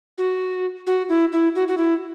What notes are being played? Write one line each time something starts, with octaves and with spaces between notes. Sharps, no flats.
F#4
F#4
E4
E4
F#4
F#4
E4